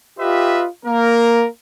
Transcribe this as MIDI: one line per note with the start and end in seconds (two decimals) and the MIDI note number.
0.18 0.65 65
0.18 0.65 67
0.18 0.65 71
0.18 0.65 75
0.18 0.65 76
0.85 1.45 58
0.85 1.45 70